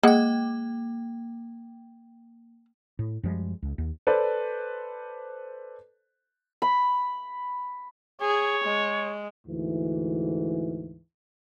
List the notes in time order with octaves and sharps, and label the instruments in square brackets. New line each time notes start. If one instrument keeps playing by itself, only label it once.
[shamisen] G#3 F#5 [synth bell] A#3 G5
[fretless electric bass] A2
F#2 F3 G3 G#3
C#2
D#2
[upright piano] A4 B4 C5 D5
[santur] B5
[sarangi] G#4 [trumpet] C#5
[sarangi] G#3
[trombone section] D2 G#2 E3